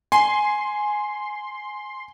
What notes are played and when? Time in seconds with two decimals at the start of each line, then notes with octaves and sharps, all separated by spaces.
0.12 G#5 C6